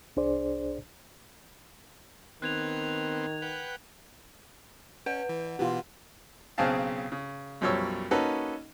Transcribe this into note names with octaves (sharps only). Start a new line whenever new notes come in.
C2 D4 G#4 C5 D5
D#3 B3 C4 F#6 G#6 F7
B4 F#5 G5
C#4 B4 F#5
E3
B2 E3 B3 F4 G4
B1 C#3 C4 G#4 F5 A5
C#3
B1 F#2 F3 G3 C#5 E6
A#3 C#4 D#4 F#4 A4 B4